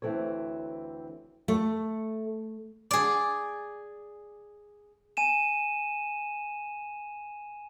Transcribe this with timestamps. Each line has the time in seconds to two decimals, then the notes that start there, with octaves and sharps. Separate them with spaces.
0.02 D2 E3 C4 A4 C#5
1.48 A3
2.91 G#4 D5
5.17 G#5 D#7 E7